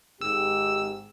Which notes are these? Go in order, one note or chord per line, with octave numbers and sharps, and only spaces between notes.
G#1 G#2 G4 E6